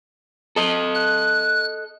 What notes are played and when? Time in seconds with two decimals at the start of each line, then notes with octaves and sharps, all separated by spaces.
0.56 A4 D#5
0.95 F#6